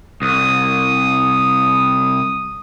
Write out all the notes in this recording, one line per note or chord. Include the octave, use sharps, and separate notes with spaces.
C2 D#6